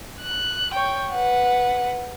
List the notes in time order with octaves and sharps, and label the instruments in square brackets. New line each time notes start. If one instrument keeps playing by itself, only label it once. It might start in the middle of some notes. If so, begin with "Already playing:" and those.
[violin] F#6
C#5 G5
B4 F#5